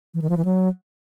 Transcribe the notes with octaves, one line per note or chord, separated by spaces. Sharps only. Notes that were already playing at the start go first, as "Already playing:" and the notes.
E3
D#3
F3
E3
F#3